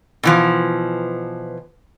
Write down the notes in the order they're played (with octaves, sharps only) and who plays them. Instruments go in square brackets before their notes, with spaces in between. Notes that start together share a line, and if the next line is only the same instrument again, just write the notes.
[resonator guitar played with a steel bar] B2 E3 F3